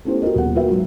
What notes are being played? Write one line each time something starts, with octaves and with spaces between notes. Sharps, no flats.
A3 B3 C#4 E4 G4 C5
F#4 G4 A#4 D#5
D#1 B3 F#5
F4 F#4 A#4 B4 E5 G5
G#2 F#3